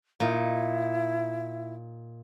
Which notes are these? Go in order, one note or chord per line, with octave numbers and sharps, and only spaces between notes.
A#2 D#4 E4